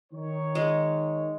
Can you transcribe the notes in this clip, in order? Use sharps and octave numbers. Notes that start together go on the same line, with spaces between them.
D#3 C#5
G#3